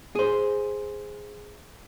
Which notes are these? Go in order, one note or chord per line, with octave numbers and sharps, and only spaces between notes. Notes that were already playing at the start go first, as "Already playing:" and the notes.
G#4 C5